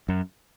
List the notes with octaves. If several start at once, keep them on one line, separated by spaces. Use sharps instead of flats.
F#2